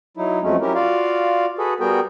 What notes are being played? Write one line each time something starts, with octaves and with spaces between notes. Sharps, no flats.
F#3 D#4 E4
F2 F#3 G#3 A3 C#4
F#3 C#4 E4 G4 A#4
F4 F#4 D5 F5
F#4 G#4 A4 B4
G3 B3 F#4 G#4 A#4 G5